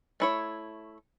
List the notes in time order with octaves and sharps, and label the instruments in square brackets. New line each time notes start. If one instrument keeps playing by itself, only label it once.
[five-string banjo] A3 E4 C#5